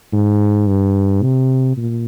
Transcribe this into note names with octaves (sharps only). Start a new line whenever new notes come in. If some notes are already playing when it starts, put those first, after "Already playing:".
G#2
G2
C3
A#2